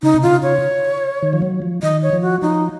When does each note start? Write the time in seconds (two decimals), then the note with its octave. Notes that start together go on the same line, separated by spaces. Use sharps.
0.03 C#3 D#4
0.14 C3
0.23 C#3 F4
0.43 C#5
1.23 D#3
1.33 F3
1.42 F#3
1.62 F3
1.82 D#3 D#5
2.03 C#5
2.13 F3
2.22 F#4
2.42 F3 D#4